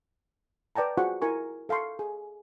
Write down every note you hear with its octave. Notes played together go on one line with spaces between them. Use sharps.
B4 D5 G5 A5 A#5
F4 F#4 G#4 C5 F#5 C#6
E4 A#4 G#5 C#6
A4 F5 A5 C6 C#6
G#4